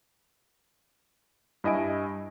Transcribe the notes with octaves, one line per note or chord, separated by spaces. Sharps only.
G2 E4 D#5 G#5 D7